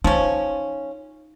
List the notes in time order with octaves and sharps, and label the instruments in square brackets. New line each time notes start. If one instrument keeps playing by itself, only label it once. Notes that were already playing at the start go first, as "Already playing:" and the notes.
[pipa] F3 C#4 [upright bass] D#4